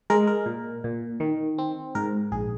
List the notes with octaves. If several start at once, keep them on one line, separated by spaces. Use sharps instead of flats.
G#3 A#4
A#4
A#2
A#2
D#3
C4
G#2 A#4
A#1 G#4